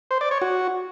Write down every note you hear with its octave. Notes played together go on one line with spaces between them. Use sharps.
C5
D5
C#5
F#4